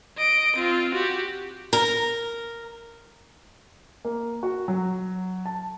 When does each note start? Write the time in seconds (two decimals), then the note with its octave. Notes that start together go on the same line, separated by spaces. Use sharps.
0.17 D#5 D7
0.56 C4 F4
0.94 F#4 G4
1.73 A#4
4.05 A#3
4.43 F#4
4.68 F#3
5.46 A5